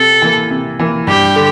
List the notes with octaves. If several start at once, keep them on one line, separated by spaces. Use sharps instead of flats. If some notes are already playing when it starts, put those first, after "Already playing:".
Already playing: C3 A4
E3 A#3
C3
E3 A#3
G2 G4
D3